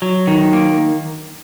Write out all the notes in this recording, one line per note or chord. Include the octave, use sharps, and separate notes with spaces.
F#3
D#3
A#3